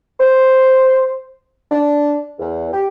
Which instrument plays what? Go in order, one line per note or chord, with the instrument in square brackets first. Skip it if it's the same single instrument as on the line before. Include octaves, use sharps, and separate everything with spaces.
[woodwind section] C5
D4
E2
G4